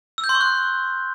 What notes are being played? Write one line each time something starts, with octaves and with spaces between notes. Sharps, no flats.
E6
G6
C6
C#6
F#6